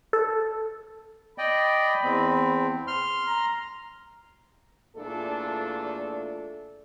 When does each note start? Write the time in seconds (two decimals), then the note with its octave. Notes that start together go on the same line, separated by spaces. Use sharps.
0.13 A4
1.38 D5 D#5 G5 B5
2.04 E2 C4
2.87 C6 F6
3.27 A#5
4.96 E2 A#2 A3 D4 F4 A4